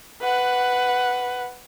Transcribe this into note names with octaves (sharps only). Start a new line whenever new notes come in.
B4 F#5